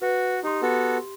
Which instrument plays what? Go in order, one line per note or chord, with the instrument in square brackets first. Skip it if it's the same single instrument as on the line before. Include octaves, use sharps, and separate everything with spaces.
[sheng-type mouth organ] F#4 [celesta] B4
[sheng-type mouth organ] D#4 [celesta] G4 C6
[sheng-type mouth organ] B3 F#4 A4